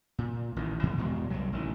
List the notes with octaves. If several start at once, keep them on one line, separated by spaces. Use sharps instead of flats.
A#2
A1 D#3
B2 E3 F3 G#3
E2 G2 B2 G#3
C2 G2 F#3
A1 D#3